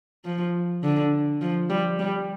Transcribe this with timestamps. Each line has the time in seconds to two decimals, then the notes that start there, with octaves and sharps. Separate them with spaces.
0.25 F3
0.83 D3
1.41 F3
1.70 G3
1.99 G3